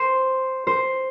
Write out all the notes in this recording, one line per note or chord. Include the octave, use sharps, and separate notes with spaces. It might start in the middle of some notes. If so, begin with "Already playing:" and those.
Already playing: C5
C5